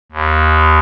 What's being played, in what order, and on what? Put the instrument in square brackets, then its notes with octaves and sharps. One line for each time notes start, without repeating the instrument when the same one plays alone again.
[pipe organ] D#2